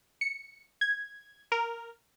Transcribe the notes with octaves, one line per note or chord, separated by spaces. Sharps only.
C#7
G#6
A#4